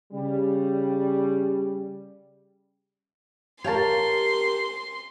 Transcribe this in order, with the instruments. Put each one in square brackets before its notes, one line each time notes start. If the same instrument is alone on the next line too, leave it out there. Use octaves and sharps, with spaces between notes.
[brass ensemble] C#3 G3
[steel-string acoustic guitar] G4 A#4 [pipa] C#5 F5 A5 [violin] C6